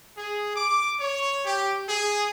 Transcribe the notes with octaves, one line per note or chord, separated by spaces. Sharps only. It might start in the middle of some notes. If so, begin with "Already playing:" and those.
G#4
D6
C#5
G4
G#4